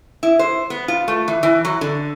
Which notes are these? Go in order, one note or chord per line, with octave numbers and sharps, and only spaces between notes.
E4
C5
B3
F4
A3
E3
E3
F#3
D3